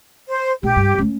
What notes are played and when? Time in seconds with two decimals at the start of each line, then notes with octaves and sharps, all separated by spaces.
0.28 C5
0.63 A#1 G4
0.76 G2
0.98 A3 C#4